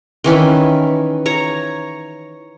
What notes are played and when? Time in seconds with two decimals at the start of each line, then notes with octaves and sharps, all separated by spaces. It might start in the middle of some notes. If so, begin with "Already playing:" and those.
0.24 D#3 E3 C#4 B4
1.26 C#5 A#5